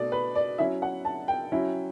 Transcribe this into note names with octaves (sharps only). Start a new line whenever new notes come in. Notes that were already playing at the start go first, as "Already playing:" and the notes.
Already playing: B2 A3 D5
B4
D5
F#3 C#4 E4 E5
F#5
A5
G5
F#3 C#4 E4